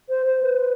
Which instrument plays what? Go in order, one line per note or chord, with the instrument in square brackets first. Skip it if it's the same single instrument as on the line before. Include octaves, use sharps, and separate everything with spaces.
[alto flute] C5
C5
B4